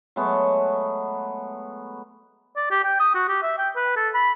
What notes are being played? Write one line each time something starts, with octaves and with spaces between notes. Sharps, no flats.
F#3 G#3 A3 B3
D5
G4
G5
D#6
F#4
G4
E5
G5
B4
A4
B5